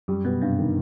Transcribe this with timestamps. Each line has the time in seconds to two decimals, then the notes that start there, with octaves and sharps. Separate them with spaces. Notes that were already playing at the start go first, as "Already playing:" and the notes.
0.08 F#2 G3
0.25 B2 B3
0.41 G2 C3
0.59 D#3